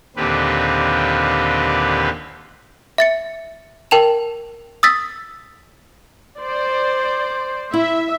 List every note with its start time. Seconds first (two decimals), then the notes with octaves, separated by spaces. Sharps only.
0.16 D#2 A#2 D3 C4 G4 B4
2.98 E5 A6 C#7
3.91 A#4 G5 A5 E7 F7
4.83 D#6 E6 A6 B6
6.38 C5 D5
7.74 E4 E5